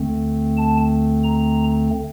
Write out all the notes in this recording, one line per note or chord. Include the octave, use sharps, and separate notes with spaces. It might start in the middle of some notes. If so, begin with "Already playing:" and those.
Already playing: D2 D3 A3 C4
A5
A#5